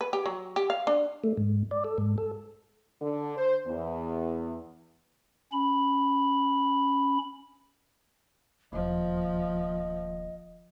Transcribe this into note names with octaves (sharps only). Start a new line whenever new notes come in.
B4
G4
F#3
G4
F5
D4
A3
G#2
D5
A4
G#2
A4
D3
C5
E2
C#4 B5
E1 D#2 F3 D#5